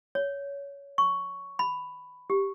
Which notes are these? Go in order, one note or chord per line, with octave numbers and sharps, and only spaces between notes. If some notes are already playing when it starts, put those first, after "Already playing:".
C#5
C#6
B5
G4